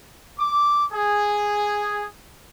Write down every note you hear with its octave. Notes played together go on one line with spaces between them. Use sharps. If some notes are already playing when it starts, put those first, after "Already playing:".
D6
G#4